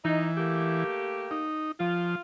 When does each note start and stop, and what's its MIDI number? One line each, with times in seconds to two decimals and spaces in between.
0.05 0.84 52
0.05 0.28 63
0.37 1.48 57
0.37 1.48 58
0.37 1.48 67
1.31 1.72 63
1.80 2.15 53
1.80 2.21 65